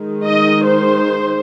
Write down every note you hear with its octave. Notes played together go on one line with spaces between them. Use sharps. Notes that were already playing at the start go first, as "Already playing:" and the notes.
Already playing: D#3 G#3 D#4
D#5
C5